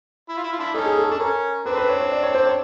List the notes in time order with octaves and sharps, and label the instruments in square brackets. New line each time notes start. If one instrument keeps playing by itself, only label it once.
[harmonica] E4
F4
E4
F4
D4 E4
[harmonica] C#4 D#4 [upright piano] A4
[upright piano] G#4
A4
[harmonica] D4 [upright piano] A4
[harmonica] C#4 [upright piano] A#4
[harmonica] C4 D4 [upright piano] B4
[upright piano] B4
C#5
C#5
D5
C#5
C5
C#5